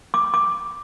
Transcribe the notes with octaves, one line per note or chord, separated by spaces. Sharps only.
D6
D6